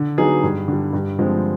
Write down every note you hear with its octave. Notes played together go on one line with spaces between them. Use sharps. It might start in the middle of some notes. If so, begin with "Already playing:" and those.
Already playing: D3
F#3 B3 D#4 G#4
G2
D3 G3
G2
D3 F3 G#3 C4